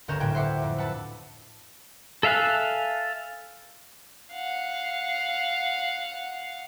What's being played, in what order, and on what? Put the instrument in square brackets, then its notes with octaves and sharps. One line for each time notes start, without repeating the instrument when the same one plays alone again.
[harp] G1 D2 C#4 A#4 G6 E7
A2 D3 F#3 B4 G5 G#6
C5 E5 F#5 D6
F2
B4 F#5 A5 E6
[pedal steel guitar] A4 E5 F5 G#5 F#6
[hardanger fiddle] F5 F#5